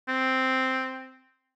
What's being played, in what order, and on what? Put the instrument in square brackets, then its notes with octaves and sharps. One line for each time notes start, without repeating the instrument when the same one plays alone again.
[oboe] C4